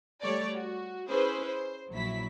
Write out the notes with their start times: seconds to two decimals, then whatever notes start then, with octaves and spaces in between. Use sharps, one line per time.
0.22 G3 A3 C#5 D5
0.56 F#4
1.09 C#4 E4 G#4 B4 C5
1.48 C5
1.92 A#1 F#3 E4 B6